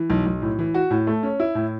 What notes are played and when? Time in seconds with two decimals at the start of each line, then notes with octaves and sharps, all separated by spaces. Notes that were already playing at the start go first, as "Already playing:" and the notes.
Already playing: E3
0.10 B1
0.26 B1
0.42 A2
0.59 E3
0.74 F#4
0.91 A2
1.07 A3
1.23 C#4
1.40 E4
1.55 A2